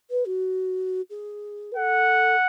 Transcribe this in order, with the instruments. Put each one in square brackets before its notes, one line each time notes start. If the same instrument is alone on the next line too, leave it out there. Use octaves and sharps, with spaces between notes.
[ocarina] B4
F#4
G#4
B4
[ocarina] A4 [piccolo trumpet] F#5